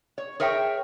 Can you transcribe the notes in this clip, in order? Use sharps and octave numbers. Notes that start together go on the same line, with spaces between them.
C#5
G#4 A#4 C#5 E5 G5